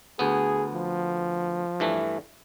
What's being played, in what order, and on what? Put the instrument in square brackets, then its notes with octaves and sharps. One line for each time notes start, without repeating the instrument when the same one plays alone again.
[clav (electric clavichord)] D2 B3 [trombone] G#4
[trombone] F3
[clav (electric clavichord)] G2 E3 A3